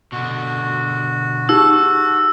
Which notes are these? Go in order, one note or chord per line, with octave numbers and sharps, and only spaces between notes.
B2 D3 F#4
D#4 G4 G#4 A5 E6